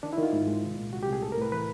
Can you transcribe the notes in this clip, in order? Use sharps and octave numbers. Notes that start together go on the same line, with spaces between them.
D#3 D4
E4
D#3 F4
G#2
G#3
C2
A#2
C2 F#4
G4
C2
G#4
A2 A4
A#4
A2 B4
E3 B4